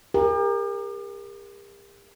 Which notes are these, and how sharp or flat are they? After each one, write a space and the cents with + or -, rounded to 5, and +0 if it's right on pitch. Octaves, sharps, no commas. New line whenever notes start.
G4 +40 A#4 +0